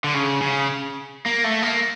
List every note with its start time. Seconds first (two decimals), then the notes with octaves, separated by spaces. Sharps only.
0.04 D3
0.14 C#3
0.42 C#3
1.26 A#3
1.44 A3
1.63 A#3